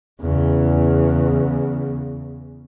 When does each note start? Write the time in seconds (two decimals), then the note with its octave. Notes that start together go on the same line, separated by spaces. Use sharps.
0.20 E2 C#3